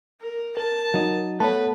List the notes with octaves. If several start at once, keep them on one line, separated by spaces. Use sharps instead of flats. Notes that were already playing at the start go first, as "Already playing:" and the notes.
A#4
A#4 A5
F#3 D#4
A3 B3 B4 C#5 A5